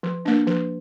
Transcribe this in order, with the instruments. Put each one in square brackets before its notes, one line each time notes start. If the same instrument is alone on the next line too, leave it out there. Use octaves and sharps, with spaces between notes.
[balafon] F3
A#3 D4
F3